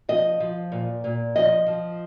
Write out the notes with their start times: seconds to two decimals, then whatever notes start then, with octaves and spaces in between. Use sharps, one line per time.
0.09 F3 D#5
0.40 F3
0.72 A#2
1.04 A#2
1.36 F3 D#5
1.67 F3